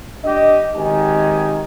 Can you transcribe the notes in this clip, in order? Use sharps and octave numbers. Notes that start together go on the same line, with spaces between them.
D4 G4 D#5
G#1 D#3 D#4 G4 G#5